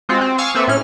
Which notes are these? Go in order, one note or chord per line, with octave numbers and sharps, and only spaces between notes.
G#3 C4 F4 F#4
C4
F5 G#5 C#6 D#6 E6
A#3 C4 A4 B4 E5
A2 C#4 F6